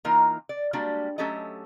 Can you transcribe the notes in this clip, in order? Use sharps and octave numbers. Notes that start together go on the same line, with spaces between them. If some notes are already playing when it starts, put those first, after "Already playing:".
E3 A#3 D#4 F4 A#4 D#5
D5
G3 G#3 A#3 D4 F#4 G4
F#3 A3 C#4 G4 A4 D#5